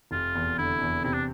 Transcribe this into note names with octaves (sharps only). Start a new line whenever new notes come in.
F1 F4
E2
D3 E4
E2
C3 E4
D4